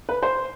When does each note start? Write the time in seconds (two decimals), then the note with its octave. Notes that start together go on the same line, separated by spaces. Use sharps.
0.09 B4
0.23 C5